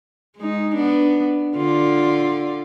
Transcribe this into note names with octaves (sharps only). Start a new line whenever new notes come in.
G#3 D#4
B3 D4
D3 F4 D5